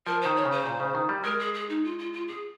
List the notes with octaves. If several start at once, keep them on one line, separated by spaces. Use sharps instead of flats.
F3 A#4
D#3 C5
C#5
C#3
C5
A#2
C#3
D#3
G3
G#3 A#4
G#4
G#4
D#4
F4
F4
F4
G#4